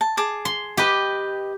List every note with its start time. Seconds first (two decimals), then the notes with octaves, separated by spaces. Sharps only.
0.01 A5
0.17 G#4 A5 D6
0.45 C6
0.77 G4 B4 D#5 G5